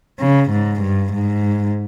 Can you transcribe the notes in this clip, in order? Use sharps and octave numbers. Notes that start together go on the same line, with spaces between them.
C#3
G#2
G2
G#2